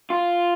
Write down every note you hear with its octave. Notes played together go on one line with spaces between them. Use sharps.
F4